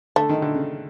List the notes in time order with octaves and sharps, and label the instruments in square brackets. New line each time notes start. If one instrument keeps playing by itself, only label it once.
[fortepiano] D3 [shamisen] A3
[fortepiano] D#3
D3
C#3